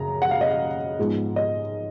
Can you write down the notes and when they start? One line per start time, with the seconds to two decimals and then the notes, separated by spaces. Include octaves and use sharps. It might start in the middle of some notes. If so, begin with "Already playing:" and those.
Already playing: F#2 C#3 A#5
0.22 F#5
0.31 F5
0.41 D#5
0.51 F5
0.98 G#2 F3 G#3 B3
1.36 D#5